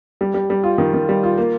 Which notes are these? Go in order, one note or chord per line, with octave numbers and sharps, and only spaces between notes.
G3
G3
G3
F4
D#3
D#3
G3
F4
A#3